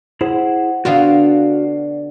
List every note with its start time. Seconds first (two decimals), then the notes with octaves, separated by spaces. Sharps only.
0.21 E4 G#4 C5 F#5
0.85 D3 B3 F4 F#4 D5 F5